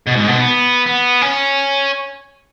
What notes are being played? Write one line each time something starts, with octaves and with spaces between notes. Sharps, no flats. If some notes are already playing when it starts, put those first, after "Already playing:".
B2
G#2
B2
B3
B3
C#4